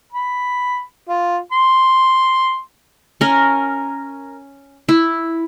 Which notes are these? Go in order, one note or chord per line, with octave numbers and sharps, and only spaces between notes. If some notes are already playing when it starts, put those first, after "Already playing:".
B5
F4
C6
C#4 A#4
E4